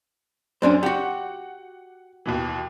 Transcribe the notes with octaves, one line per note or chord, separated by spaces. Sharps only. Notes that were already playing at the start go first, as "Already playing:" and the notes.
F#2 C#4 D4 C5
F#4 G4 F#5
D#2 B2 E3